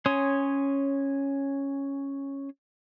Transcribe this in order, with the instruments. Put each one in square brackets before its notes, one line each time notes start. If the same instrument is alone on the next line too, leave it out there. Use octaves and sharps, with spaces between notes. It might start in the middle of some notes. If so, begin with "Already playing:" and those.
[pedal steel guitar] C#4 C#5 G#5 C6 D#6